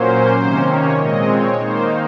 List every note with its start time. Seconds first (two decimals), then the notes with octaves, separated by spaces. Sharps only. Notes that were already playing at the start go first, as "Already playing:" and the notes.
Already playing: A#2 F#3 A#3 C#4 C5
0.40 C3 D#3 A#3 C#4
0.69 C#5
0.98 A#2 G#3 C4 D#5
1.29 C#5
1.57 D#3 A#3 D#4 C5